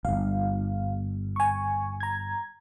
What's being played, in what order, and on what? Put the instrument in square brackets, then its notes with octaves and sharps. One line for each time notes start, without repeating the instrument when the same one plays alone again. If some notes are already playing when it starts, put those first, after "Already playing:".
[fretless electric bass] D1 G1 [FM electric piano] F5
[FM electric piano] G#5 C#6
A#5 G#6